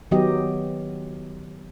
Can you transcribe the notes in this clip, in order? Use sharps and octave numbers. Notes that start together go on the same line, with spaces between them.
D#3 F#3 B3 G4 D#5